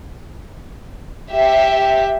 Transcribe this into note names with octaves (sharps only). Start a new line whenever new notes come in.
G4 E5